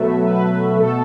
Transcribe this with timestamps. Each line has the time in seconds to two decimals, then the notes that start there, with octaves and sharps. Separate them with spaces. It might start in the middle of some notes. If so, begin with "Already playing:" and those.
Already playing: B2 F#3 A3 B4 E5
0.26 B4
0.76 B2 A3 A4